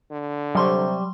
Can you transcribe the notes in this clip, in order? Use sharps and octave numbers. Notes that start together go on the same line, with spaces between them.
D3
C3 F#3 G3 C6 C#6